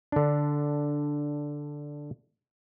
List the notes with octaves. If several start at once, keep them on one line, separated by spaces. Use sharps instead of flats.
D3 D4